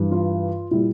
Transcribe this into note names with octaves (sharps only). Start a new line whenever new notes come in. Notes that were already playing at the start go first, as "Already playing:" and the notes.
Already playing: G2 E3 G3
F4
A#2 G3 E4